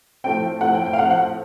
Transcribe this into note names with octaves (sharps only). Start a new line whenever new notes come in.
A2 F3 A3 C4 G5
A2 F3 A3 C4 F#5
G5
G5
F5
A2 F3 A3 C4 F#5
F#5